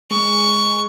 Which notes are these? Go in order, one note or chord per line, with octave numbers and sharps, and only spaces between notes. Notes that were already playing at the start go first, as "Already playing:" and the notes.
G#3 C#6